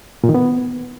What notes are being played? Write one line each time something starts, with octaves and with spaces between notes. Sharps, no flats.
A#2
D#3
B3